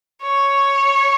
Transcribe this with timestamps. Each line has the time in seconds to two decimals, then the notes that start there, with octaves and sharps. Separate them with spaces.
0.23 C#5